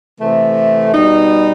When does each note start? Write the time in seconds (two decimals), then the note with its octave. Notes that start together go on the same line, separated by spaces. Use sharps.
0.20 C3 E3 A3
0.93 B2 G3 D#4